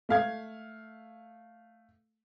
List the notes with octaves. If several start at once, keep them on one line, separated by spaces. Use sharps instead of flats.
A3 F5 G#6